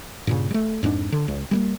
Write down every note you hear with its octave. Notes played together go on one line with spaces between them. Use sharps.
G2 A#2 C#3
G3 A3
F2 G#2 A3 D4
D3
C#2
G3 A3 A#3